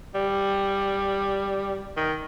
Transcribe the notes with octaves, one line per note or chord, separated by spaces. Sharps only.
G3
D#3